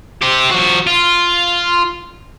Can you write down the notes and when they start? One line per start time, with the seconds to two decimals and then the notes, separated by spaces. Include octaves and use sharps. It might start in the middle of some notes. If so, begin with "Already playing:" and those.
0.22 C4 G4
0.51 F3 F#4
0.87 F4